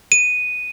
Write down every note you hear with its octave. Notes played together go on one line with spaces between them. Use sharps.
D#7